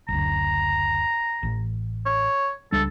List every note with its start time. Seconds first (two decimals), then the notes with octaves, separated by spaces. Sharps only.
0.08 F#1 D2 A#5
1.43 A1
2.06 C#5
2.72 C#2 G3 D4 A4